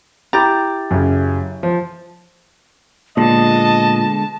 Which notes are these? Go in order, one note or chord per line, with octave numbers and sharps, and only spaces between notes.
E4 G4 A#5 A6
F#2 C#3
F3
A#2 D3 G#3 B3 D#5 A5